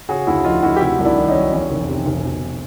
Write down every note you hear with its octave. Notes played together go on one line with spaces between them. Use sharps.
C#3 F#4 G#4
D2 E4 F#4
F3 D#4 F4
D2 E4 F#4
G4
C3 E4 F#4
C2
D4 E4
D#3
C#4 D#4
F#3
E2 C#4
F1
C3
F1
B2